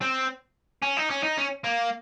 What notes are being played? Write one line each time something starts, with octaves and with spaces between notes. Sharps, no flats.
C4
C#4
D#4
C#4
D#4
C#4
A#3